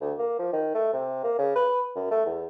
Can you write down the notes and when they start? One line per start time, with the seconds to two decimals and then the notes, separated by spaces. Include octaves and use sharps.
0.01 D2
0.18 A#3
0.38 F3
0.52 D#3
0.74 A3
0.93 C3
1.23 A#3
1.38 C#3
1.55 B4
1.95 F#2
2.10 A3
2.25 E2